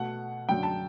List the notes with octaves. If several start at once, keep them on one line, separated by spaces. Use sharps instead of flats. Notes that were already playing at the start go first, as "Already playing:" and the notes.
Already playing: B2 A3 F#5
F#2 D3 F#3 G5
A5